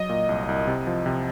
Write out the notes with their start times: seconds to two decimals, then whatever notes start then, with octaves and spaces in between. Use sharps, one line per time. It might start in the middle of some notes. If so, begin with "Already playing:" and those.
Already playing: F#3 D#5
0.09 A#2
0.29 C2
0.49 C2
0.67 C3
0.87 F3
1.06 C3